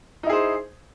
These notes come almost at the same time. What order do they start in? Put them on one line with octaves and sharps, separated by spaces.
D#4 E4 G#4 C5